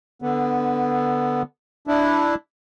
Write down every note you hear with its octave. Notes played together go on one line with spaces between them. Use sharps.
D3 B3
D4 E4